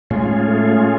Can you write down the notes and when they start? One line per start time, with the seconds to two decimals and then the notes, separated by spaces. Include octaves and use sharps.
0.10 A2 G#3 C#4 F4 G#4
0.47 A3